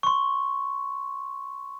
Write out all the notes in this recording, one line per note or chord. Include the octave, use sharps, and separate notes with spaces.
C6 C#6